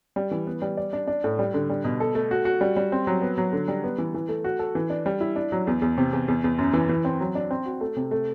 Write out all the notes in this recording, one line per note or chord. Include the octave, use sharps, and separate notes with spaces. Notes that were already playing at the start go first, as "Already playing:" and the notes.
G3
E3
B3
G3
D5
D4
D4
A2
G3
D3
G3
B2
A4
A3
F#4
F#4
G3
G3
C4
F#3
B3
F#3
D3
G3
B3
E3
E3
A3
F#4
A4
E3
D4
G3
E4
D4
F#3
E2
E2
C3
E2
E2
E2
F#2
E3
E3
C4
F#3
D4
C4
F#4
A3
C3
A3